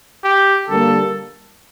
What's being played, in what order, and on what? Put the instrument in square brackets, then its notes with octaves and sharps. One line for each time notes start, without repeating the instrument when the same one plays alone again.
[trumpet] G4
[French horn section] D3 G3 A#3 [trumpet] A4